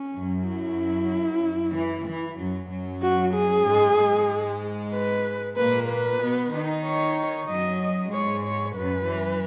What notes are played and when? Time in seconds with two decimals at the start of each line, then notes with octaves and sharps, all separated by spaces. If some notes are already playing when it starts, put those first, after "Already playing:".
Already playing: C#4
0.15 F#2 F#3
0.46 E4
1.74 E3
2.06 E3
2.38 F#2 F#3
2.70 F#2 F#3
3.02 F#4
3.34 G#4
3.66 G#2 G#3
3.97 G#2 G#3
4.94 B4
5.57 A#2 A#3 B4
5.88 B4
6.21 B2 B3
6.52 D#3 D#4
6.85 C#5
7.48 F#2 F#3 D#5
8.12 G#2 G#3 C#5
8.44 C#5
8.76 F#2 F#3 B4
9.08 E3